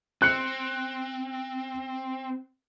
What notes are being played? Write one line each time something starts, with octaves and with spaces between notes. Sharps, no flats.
C4 F#6 C#7